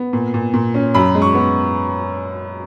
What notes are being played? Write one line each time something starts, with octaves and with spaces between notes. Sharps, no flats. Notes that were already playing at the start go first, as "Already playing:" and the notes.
Already playing: B3
A#2
A#2
A#2
C#4
F#2 B5
G#3
C#6
B3